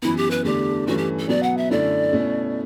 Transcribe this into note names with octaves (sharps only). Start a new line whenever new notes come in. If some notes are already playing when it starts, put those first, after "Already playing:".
F#2 E3 B3 E4
G4
B4
E2 D3 A3 D4 G4
G2 E3 A3 C#4 F#4
G4
A4
B2 F#3 B3 D5
F#5
E5
F#2 D3 A3 C#4 E4 D5
B2 A3 C#4 E4